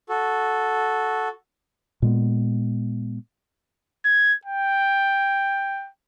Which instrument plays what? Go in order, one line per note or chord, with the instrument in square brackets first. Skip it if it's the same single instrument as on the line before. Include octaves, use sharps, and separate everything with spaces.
[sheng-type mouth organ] F#4 A4
[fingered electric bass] A#2 G#3 B3
[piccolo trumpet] G#6
G5